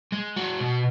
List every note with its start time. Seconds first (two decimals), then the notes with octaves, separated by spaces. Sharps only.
0.12 G#3
0.36 F#4
0.60 B2